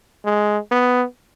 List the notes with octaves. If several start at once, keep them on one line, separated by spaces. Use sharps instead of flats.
G#3
B3